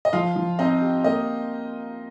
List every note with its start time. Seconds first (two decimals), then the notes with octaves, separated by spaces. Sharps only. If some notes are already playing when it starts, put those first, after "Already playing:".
0.05 D#5
0.13 F3 F4 F5
0.36 F3
0.59 C4 D#4 D#5
0.82 G4
1.04 A#3 D#5